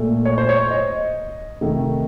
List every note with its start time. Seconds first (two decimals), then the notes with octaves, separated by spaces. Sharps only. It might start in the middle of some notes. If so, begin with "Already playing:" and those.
Already playing: A#2 A3
0.25 C#5
0.38 C5
0.49 C#5
0.71 D#5
1.61 C3 D#3 A3